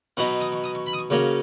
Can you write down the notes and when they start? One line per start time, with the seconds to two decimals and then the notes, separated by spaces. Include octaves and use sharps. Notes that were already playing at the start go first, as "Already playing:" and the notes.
0.17 B2 F#3 B3 D#4 F#5
0.40 D#6
0.52 C#6
0.64 D#6
0.75 C#6
0.87 B5
0.93 D#6
0.99 C#6
1.10 C#3 F#3 A#3 C#4 C#6